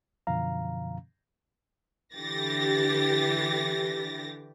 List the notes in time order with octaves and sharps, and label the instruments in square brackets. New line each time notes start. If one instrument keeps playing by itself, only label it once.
[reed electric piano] F#2 B2 D3 F3 F5 A#5
[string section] D3 E3 G4 A6 A#6